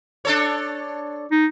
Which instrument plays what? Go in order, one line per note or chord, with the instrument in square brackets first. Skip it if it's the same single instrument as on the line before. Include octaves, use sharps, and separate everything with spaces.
[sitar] D4 A4 C#5
[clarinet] D#4